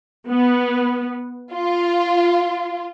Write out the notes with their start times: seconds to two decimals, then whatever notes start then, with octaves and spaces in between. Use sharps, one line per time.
0.28 B3
1.53 F4